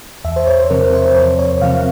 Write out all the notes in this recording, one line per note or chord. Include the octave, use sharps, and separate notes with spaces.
E2 E5
C5
C#5
C5
C3 F3 C4 A#4
C5
E2 C5
C#5
C3 F3 C4 F5